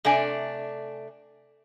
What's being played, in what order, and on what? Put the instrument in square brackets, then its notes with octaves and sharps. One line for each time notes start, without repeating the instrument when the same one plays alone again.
[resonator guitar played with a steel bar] C3 A3 D4 D5 G#5